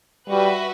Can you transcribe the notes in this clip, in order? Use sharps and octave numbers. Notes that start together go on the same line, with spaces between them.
G3 F#4 B4 E5